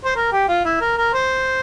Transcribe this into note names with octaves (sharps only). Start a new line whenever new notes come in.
C5
A#4
G4
F4
E4
A#4
A#4
C5